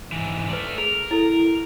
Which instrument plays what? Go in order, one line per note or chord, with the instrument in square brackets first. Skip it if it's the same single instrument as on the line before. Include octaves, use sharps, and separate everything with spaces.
[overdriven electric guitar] G#2 E3
[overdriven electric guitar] A3 D5 [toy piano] B4 A5 C6
[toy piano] G#4 [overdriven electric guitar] A#4
[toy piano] E4 A4